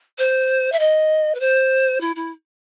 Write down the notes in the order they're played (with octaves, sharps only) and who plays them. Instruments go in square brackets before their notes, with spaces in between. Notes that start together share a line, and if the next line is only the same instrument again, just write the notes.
[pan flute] C5
E5
D#5
B4
C5
E4
E4